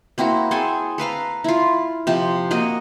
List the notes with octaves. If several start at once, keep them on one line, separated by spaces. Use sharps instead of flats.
A#3 C4 E4 F#4
C4 G#4 A4 G#5
A4 B4 F5 A#5
E4 F4
C3 F3
A#3 F#4 D#5